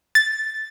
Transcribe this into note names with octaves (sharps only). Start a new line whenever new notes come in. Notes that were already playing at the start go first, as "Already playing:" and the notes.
A6